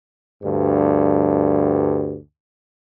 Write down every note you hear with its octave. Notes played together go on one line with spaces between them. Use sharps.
D2 G2